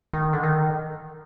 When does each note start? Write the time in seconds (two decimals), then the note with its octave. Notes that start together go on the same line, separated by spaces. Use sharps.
0.13 D#3
0.33 D3
0.43 D#3